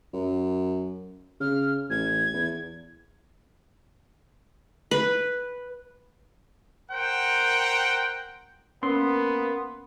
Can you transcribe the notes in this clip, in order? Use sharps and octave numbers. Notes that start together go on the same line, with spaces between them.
F#2
C#3 F6
A1 G#6
E2
B4
A#4 C5 F#5 G5
A#3 B3 C#4 C6